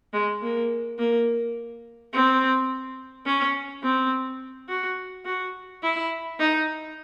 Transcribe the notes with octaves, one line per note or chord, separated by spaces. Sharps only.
G#3
A#3
A#3
C4
C#4
C4
F#4
F#4
E4
D#4